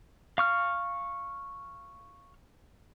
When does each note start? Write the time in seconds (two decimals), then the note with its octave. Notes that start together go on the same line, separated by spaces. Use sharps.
0.38 F5 C#6 F6